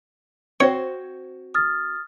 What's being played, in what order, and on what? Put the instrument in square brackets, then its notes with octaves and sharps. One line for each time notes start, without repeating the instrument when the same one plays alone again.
[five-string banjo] C4 F#4 C5 [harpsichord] C#5
[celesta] D#6 F6 A6